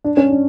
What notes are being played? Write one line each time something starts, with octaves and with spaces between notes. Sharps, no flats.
D4
C#4
D4